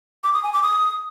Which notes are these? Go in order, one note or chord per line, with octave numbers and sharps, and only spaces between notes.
D6
D#6
G#5
D6
D#6